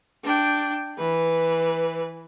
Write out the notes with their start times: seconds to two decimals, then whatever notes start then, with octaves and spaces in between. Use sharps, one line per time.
0.24 D4 G5
0.98 E3 B4